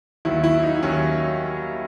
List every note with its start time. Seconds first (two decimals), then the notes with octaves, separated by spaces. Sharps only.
0.25 D#2 D#3 F#3 E4
0.44 E4
0.63 D#4
0.83 D#2 D#3 F#3 C#4